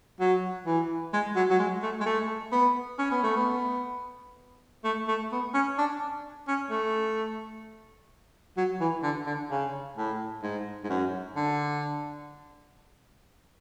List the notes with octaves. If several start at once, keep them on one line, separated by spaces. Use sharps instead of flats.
F#3
E3
G#3
F#3
F#3
G#3
A3
G#3
A3
B3
C#4
B3
A3
B3
A3
A3
B3
C#4
D4
C#4
A3
F#3
E3
D3
D3
C#3
A2
G#2
G#2
F#2
D3